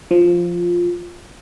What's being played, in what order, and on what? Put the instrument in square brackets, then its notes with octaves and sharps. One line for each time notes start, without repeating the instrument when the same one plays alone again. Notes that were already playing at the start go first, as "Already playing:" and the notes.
[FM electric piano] F3